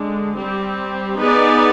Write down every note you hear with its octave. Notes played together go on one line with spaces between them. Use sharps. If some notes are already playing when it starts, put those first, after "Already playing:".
Already playing: D3 G#3 D4
G3 C4 G4
B3 D#4 G#4 B4 D5